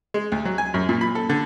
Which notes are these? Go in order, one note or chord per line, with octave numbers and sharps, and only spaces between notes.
G#3
D2
F#3
G#5
F#2
A#2
B5
A4
D3